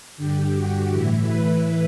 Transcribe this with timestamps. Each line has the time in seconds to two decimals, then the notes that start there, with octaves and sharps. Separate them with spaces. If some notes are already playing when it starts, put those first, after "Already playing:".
0.17 G2 D3 G4
0.54 F#4
0.90 A2 E3 E4
1.27 B4